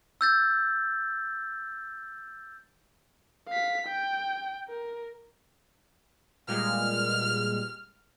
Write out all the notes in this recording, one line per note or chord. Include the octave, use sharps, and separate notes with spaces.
E6 G6 A6
F5 B6
G5
A#4
A#2 G3 G#3 F6